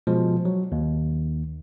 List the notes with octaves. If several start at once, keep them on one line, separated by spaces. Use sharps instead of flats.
B2 F3 G#3
F#3
D#2